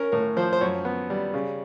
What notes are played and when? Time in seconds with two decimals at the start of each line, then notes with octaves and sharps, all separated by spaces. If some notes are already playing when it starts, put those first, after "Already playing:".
Already playing: C#4 A#4
0.12 A2 A#4
0.37 F3 C5
0.53 C5
0.61 F#2 C#5
0.85 B3
1.10 G3
1.34 C#3